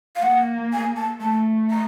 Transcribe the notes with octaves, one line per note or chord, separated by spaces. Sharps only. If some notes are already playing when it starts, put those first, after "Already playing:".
F5
A#3 F#5
G#5
A5
A3 A5
A#5